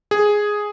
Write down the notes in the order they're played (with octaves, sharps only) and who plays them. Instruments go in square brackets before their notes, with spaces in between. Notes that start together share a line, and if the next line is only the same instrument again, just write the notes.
[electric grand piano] G#4